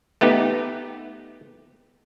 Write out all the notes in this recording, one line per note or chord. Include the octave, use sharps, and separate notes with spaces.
A3 B3 D#4 G4